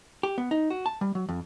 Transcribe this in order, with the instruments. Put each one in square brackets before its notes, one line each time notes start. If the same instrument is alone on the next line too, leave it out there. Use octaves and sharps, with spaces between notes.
[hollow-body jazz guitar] G4
B3
D#4
F#4
A5
G3
F#3
F2